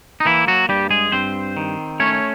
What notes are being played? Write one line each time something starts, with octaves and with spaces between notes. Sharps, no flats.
D#4
E3 A#3 E4
F#3 F#4
G2 G3 G4
G#3 G#4
G2 C4 C5
D#3
A3 C#4 C#5